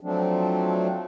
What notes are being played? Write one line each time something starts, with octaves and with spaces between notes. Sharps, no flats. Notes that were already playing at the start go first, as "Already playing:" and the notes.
F3 F#3 A3 C4 D4